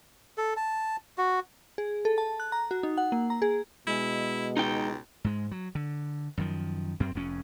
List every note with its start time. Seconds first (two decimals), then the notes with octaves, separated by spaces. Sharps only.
0.38 A4
0.57 A5
1.18 F#4
1.78 G#4
2.05 A4
2.18 A5
2.40 F#6
2.52 A#5
2.71 F#4
2.83 D#4
2.98 F#5
3.12 A#3
3.30 A#5
3.42 G#4
3.87 B2 G#3 E4
4.57 C#2 D#4 G5
5.24 G#2 G#3
5.51 F#3
5.75 D3
6.37 F#2 D#3 F3
7.00 F#2 C4
7.15 F1 F2 C#4